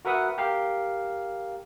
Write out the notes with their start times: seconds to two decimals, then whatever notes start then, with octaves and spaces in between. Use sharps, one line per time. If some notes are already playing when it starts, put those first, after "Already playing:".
0.05 F#4 A#4 B4 E5 F#5 D#6
0.38 G4 A#4 F5